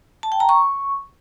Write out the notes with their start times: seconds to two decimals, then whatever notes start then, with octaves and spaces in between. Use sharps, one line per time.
0.23 A5
0.32 G5
0.40 A#5
0.49 C#6